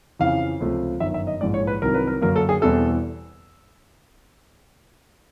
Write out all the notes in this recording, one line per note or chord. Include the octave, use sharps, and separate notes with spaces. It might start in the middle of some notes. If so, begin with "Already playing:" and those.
F2 C#3 E3 F5
C#2 C3 F3 A3
G1 F#2 D#3 E5
E5
D#5
A#1 G#2 E3 G#3 D5
C#5
B4
C2 C3 D#3 F#3 A#4
B4
A#4
F#2 D3 F#3 A#3 A#4
A4
G#4
E2 B2 G3 C4 E4 A4